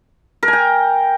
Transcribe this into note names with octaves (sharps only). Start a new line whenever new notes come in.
A#4
G#5
G5